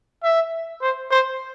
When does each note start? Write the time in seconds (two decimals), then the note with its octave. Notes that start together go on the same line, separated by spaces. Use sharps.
0.23 E5
0.81 C5
1.11 C5